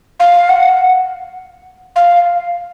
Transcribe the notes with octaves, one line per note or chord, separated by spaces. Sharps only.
F5
F#5
F5